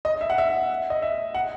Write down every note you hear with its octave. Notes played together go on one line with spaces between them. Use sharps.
D#5
E5
F#5
E5
D#5
E5
F#5